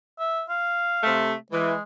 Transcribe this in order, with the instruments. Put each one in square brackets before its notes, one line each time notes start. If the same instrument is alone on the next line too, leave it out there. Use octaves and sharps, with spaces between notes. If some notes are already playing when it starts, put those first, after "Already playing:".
[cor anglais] E5
F5
[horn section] C3 A3
[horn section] E3 [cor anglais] G#3